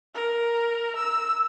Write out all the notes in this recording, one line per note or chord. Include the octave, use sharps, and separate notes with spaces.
A#4
E6